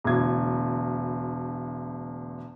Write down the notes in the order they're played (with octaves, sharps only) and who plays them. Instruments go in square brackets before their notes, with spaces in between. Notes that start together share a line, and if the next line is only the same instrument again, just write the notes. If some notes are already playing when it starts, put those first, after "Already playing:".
[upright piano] E1 D2 G#6